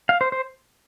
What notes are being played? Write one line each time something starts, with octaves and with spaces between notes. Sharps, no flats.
F5
C5
C5